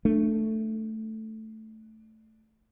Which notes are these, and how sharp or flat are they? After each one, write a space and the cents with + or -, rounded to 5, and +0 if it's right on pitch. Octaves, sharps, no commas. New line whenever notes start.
A3 +0 D4 +15